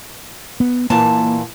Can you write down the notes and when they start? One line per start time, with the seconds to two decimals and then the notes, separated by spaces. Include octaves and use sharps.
0.60 B3
0.90 A#2 E3 A#3 A5